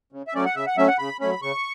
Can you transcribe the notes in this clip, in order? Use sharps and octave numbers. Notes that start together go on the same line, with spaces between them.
C#3
E5
F#3 A3 C#4 D5
F#5
C#3 E5
F#5
F#3 A3 C#4 E5
F#5
C#3 B5
F#3 A3 C#4 B5
C#3 C#6